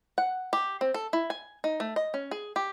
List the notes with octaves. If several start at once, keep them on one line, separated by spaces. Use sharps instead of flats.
F#5
G4
C4
A4
E4
G#5
D#4
A3
D#5
C#4
G#4
G4